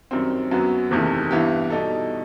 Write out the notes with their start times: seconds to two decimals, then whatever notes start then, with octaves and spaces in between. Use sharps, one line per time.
0.11 F#2 D#3 G3 C4
0.51 F#2 F#3 B3 F#4
0.91 F#1 E2 C3 D#3 A3
1.31 G2 E3 B3 E4 G4
1.70 B2 G3 D#4 A4